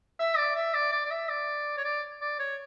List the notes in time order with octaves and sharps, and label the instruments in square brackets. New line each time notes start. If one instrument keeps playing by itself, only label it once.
[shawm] E5
D5
E5
D5
D5
D5
E5
D5
C#5
D5
D5
C#5